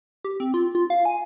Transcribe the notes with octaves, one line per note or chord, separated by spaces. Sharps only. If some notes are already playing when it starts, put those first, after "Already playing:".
G4
C4
F4
F4
F5
G#5